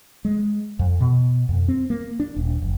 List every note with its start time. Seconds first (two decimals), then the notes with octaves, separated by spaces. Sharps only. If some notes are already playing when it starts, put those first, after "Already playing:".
0.25 G#3
0.79 F2
1.00 B2
1.49 F2
1.68 C4
1.90 A#3
2.20 D4
2.36 D#1
2.62 F#1